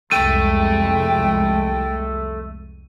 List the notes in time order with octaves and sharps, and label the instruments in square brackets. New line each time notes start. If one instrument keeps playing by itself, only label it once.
[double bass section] C2 F2 G#3 [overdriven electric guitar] A3 [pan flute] G5 [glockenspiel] D#7